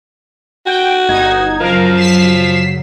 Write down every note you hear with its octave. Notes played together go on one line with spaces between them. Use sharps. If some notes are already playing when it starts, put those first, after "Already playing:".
F#4 G5
G1 D#4 G#6
F#2 C#3 F3 F#3 A#4 F5
B6 C7 E7